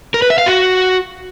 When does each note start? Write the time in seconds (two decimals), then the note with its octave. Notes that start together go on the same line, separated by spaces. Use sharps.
0.14 A#4
0.22 B4
0.30 E5
0.38 F5
0.46 F#4